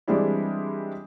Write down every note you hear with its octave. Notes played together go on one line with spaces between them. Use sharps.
E3 G3 G#3 C4 D4 E4